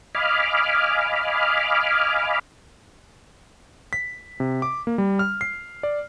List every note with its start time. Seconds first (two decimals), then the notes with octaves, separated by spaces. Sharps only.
0.15 D#5 F5 G#5 B5 D6 F6
3.93 B6
4.40 C3
4.62 D6
4.87 A#3
4.98 G3
5.19 F6
5.41 C7
5.83 D5